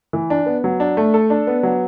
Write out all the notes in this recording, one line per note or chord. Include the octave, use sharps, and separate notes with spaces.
E3
D4
B3
F#3
D4
A3
A4
D4
B3
F#3